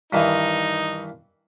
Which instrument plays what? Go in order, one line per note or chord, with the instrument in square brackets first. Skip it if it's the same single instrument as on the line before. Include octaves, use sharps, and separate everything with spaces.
[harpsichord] G2 D#3 E3 [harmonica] D#4